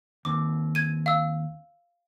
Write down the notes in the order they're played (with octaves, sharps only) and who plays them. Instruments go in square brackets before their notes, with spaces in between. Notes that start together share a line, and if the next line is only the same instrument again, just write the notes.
[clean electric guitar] D#2 C4 [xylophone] D6
[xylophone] G#6 D#7
F5 E6